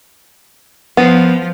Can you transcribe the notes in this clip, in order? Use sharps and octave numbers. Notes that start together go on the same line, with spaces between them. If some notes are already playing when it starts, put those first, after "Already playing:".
F3 B3